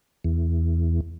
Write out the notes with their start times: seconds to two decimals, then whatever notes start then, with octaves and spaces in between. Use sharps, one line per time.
0.24 E2